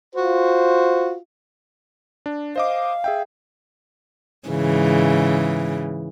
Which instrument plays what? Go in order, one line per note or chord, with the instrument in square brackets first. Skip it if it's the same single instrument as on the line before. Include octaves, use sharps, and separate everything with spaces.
[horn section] F4 F#4 C5
[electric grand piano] D4
[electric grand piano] C5 D#5 D6 [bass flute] F5
[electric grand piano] G#4 E5 G5
[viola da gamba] G#2 C#3 E3